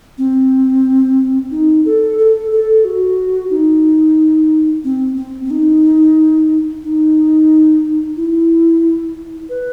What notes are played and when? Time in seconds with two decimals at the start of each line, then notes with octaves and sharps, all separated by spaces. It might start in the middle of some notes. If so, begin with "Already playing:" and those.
0.18 C4
1.51 D#4
1.85 A4
2.19 A4
2.52 A4
2.85 F#4
3.50 D#4
4.84 C4
5.17 C4
5.45 C4
5.51 D#4
6.84 D#4
8.16 E4
9.49 B4